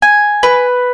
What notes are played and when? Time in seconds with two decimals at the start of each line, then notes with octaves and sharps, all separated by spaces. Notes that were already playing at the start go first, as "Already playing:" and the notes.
0.02 G#5
0.43 B4